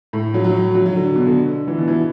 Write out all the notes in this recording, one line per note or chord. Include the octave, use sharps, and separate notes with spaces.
A2
F#3
F#3
F#3
F#3
D3
B2
D3
E3
B2
E3